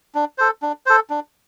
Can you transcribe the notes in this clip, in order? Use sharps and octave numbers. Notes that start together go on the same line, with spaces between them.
D4
A4 C5
D4
A4 C5
D4